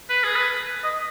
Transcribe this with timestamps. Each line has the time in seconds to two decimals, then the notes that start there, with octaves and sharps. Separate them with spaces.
0.09 B4
0.24 G#4
0.35 B4
0.83 D#5